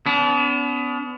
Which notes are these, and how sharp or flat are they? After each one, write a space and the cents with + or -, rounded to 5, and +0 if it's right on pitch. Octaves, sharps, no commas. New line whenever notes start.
B3 +25 D4 -45